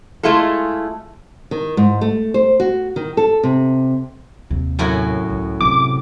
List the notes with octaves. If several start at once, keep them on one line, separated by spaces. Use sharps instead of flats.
G#3 A3 E4 F4 G#4 A4
D#3
G#2
A3
C5
F#4
D#3
A4
C3
D#2 C3
F#2 A2 F#4
C#2
C3 D6